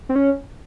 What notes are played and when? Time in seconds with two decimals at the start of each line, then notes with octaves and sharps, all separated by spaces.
0.09 C4
0.16 C#4